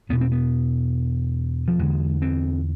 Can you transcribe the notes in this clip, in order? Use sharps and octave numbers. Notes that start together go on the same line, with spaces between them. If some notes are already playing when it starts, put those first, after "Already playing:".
E2 B2 B3
C4
B3
F3
E2 D3 G#3
C4